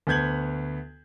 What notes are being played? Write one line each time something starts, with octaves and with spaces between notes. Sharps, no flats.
D2 B3 G6 G#6 F#7